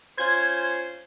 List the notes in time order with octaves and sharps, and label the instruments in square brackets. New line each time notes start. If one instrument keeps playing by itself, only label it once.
[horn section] C#4 F4 C5 [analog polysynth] G#6